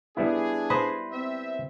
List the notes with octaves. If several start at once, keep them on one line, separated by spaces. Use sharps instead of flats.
G3 B3 D4 E4 G#4
B4 C5 D#5
C4 E5